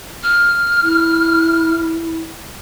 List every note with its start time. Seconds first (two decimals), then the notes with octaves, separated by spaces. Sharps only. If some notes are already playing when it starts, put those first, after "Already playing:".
0.23 F6
0.83 E4